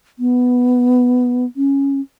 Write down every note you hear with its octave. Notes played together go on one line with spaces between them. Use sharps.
B3
C#4